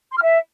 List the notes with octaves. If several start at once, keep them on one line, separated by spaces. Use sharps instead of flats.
C6
F6
E5